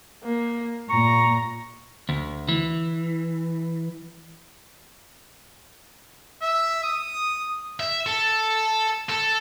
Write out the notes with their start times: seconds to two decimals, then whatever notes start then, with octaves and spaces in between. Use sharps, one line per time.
0.24 A#3
0.90 A#2 A#5 C#6
2.09 D2
2.48 E3
6.42 E5
6.84 D#6
7.80 E5
8.06 A4
9.10 A4